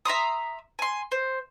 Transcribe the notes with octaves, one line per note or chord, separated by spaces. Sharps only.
E5 A#5 C6 D#6
G#5 C6
C5